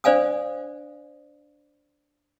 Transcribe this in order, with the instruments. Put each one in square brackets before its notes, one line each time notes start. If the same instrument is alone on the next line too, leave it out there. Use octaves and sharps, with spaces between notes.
[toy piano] D4 C5 D5 F5 G#5 D#6